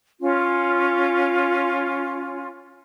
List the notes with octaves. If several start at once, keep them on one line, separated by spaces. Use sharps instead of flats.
C#4 F4